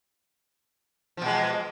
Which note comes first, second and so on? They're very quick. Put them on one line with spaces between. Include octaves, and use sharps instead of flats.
F3 B2 G#3